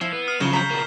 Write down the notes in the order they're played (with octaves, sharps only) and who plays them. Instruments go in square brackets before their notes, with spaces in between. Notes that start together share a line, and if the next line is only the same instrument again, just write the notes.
[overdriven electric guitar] F3 [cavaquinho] E4 [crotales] C7
[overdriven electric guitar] B3
[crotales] D#6 F6 C7
[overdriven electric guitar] F#2 F3 [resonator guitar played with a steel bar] C#3 [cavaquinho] D#4 [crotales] C#6 E7 G7
[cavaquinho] A#5 B5 [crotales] G6 B6
[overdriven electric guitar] B2 A#3